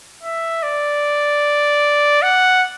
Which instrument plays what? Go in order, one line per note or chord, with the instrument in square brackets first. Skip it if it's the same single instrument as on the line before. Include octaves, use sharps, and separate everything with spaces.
[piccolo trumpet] E5
D5
F#5